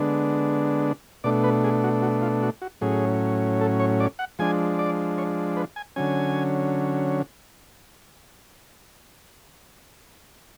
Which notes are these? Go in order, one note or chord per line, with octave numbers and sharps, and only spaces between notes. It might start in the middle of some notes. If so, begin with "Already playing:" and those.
Already playing: D3 G#3 B3 D4
B2 A3 D4 D5
B4
G#4
F#4
F#4
F4
F#4
F#4
A2 F#3 C#4 G#4
A4
C#5
D5
F#5
F3 G#3 D4 G#5
D5
C#5
B4
G#5
D3 F#3 C#4 G#5